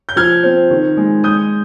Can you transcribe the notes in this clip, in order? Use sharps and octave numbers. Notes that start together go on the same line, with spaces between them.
G6
F3 F6 G#6
C4
D#3
G#3
G#3 D#6 G6